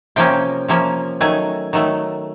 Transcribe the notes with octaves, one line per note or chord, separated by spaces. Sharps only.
C3 F3 A#3 C#4 G5
C3 F3 A#3 C#4
D#3 F#3 A3 G#5
D#3 F#3 A3